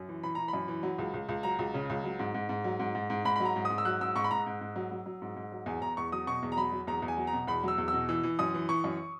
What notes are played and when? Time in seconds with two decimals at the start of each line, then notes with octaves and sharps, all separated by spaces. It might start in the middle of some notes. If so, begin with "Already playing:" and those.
Already playing: F#2
0.08 E3
0.23 E3 B5
0.35 E3 A#5
0.48 B5
0.53 F#2
0.68 E3
0.83 F#3
0.98 C#2
1.14 C#2
1.29 C#2
1.43 F#3 A#5
1.59 C#2
1.74 C#3
1.90 C#2
2.04 F#3
2.19 G#2
2.34 G#2
2.49 G#2
2.64 F#3
2.80 G#2
2.95 G#2
3.10 G#2
3.25 G#2 B5
3.36 F#3 B5
3.45 A#5
3.56 G#2
3.65 D#6
3.70 G#2
3.78 E6
3.85 F#3 F#6
4.01 G#2 E6
4.16 G#2 C#6
4.24 B5
4.31 G#2 A#5
4.46 G#2
4.61 G#2
4.76 F#3
4.91 F#3
5.06 F#3
5.22 G#2
5.36 G#2
5.52 F#3
5.66 E2 G#5
5.81 E2 A#5
5.97 E2 C#6
6.12 F#3 D#6
6.27 B2 C#6
6.43 E2
6.52 A#5
6.57 F#3 B5
6.72 F#3
6.87 E2 A#5
7.02 E2
7.08 G#5
7.17 F#3
7.27 A#5
7.33 B2
7.47 E2 B5
7.63 F#3 E6
7.78 E2
7.88 E6
7.93 B2
8.09 E3 E6
8.23 E3
8.39 F#2 D#6
8.54 E3
8.69 E3 C#6
8.84 F#2